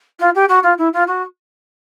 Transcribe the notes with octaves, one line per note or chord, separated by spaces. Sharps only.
F4
G4
F#4
F4
E4
F4
F#4